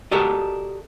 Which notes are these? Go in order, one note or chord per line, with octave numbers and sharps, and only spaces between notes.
F#4 G4 A4 A#4 D5 D#5